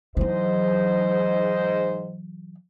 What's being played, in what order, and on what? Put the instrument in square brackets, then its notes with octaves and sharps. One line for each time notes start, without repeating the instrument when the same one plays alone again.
[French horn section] G#2 C5 D#5 [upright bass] E3 F#3